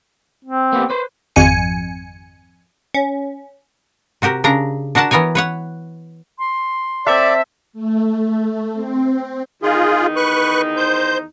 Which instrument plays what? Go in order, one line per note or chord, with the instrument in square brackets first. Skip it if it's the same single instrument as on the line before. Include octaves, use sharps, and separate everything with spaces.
[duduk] C4
[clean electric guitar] A#3 B3 G4
B4 C5
[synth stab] G#1 F2 G#5 C#7
C#4
[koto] C3 F#4 G4 A#4
C#3 D4 A#4 A#5
D4 F#4 A#4 F#5 A5
E3 B3 A#4 C#5 G#5
B4 C#5 F#5
[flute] C6
[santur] C4 A4 [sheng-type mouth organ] D5 [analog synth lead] E5
[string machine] A3
C4
[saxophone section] E2 D#3 D#4 [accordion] F4 G#4
[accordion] B4 C#6 F#6
C5 G6